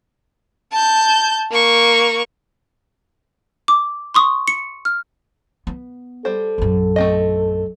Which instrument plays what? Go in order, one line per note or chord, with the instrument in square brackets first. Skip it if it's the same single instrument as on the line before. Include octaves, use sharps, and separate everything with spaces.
[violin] A5 G6
A#3 C#6
[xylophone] D6
C6 C#6 D#6
C#7
F6
[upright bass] B3
[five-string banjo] G3 C5 [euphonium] A4
[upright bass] A#1 F#2
[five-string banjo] A3 C4 D#5